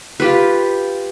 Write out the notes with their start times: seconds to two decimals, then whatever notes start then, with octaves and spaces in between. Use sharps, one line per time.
0.20 F4 G4 B4